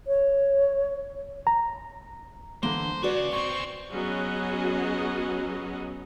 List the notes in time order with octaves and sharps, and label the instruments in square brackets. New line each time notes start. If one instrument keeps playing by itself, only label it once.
[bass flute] C#5
[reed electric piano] A#5
[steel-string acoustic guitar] D3 E3 A#3 [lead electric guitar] C5
[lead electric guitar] C#3 [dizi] F#4 [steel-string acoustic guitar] B4 D5
[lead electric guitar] A#2 C4 [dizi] C#6
[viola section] F#3 B3 C#4 F#4 G#4 D#5